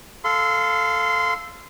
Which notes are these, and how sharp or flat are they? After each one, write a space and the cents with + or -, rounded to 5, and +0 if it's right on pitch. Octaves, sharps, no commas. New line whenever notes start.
A4 +0 F5 +0 C6 -25